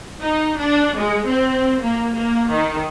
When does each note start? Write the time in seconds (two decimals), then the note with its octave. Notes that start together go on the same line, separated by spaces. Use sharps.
0.20 D#4
0.58 D4
0.97 G#3
1.26 C4
1.81 A#3
2.14 A#3
2.50 D#3